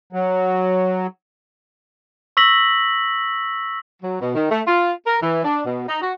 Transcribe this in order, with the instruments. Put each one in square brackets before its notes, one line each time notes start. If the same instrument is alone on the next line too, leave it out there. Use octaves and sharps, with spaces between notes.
[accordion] F#3
[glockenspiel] C#6 E6 A#6 B6 F#7
[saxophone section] F#3
B2
D#3
A3
F4
A#4
E3
D4
B2
D#4
F#4